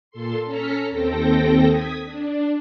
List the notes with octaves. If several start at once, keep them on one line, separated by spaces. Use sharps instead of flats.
A#2 A4 C6
C#4 A4 A#5 F6 B6 C#7
D#2 C4 A4 G5 A#6
D#6 G#6 B6
D4